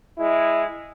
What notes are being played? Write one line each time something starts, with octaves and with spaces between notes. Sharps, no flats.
G#3 E4